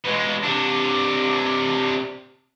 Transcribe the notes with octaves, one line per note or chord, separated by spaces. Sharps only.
B2 G#3
C3 D4